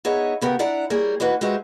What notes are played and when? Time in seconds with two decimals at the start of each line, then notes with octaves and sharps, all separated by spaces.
0.05 B3 D#4 G#4 C#5 E5
0.41 C#3 B3 G4 A#4
0.59 D4 E4 D5 F#5 A#5
0.90 G3 A#3 G#4 C#5
1.20 D#2 E3 A#3 F#4 B4
1.41 G#3 F#4 G4 B4 C5 E5